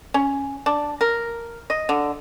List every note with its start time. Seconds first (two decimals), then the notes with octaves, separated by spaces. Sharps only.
0.14 C#4
0.66 D4
1.01 A#4
1.70 D#5
1.89 D3